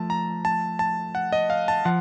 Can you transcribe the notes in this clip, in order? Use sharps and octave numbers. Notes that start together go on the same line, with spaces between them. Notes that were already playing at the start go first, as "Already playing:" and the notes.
Already playing: F3 A3 A5
A#5
A5
A5
F#5
D#5
F5
A5
F3 F#5